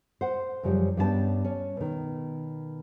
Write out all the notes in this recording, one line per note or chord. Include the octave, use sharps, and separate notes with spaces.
C5 F#5
F#2 C#3 F3 G3
G2 G3 B3 C#4 G4 A5
C#4
B2 D#3